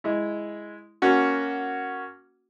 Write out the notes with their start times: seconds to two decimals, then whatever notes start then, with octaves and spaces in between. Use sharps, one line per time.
0.04 G#3 E4
1.02 A#3 C#4 F#4